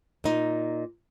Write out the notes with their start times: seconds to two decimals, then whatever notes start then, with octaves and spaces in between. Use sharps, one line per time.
0.24 A#2 D#4